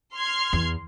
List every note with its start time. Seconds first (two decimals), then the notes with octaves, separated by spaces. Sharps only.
0.16 C6 F6 G#6
0.53 E2